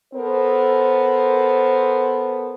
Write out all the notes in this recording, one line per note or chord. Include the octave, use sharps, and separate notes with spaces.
B3 A4 A#4 C5